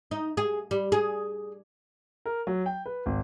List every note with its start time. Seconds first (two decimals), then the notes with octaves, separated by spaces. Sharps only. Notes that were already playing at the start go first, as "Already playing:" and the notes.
0.11 D#4
0.37 G#4
0.71 G3
0.92 G#4
2.26 A#4
2.47 F#3
2.66 G5
2.86 B4
3.06 G#1